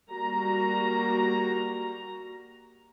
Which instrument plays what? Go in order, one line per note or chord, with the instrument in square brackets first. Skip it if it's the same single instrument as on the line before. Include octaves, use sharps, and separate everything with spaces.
[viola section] G3 A#3 F#4 A#5